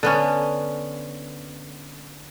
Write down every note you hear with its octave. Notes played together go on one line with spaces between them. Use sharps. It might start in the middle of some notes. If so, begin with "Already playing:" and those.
D3 B3 C#4